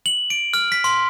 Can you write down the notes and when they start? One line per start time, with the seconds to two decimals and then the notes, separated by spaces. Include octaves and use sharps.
0.06 F#7
0.30 D7
0.53 F6
0.72 B6
0.84 C6